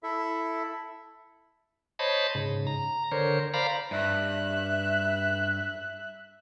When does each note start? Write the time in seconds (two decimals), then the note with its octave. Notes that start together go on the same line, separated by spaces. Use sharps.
0.03 E4 A4 E5
1.99 C5 C#5 D#5 A5 B5
2.35 G#2 C#3
2.67 A#5
3.12 D3 A#4 C5 C#5
3.54 C5 D5 F5 A#5 B5
3.91 G2 E5 F#6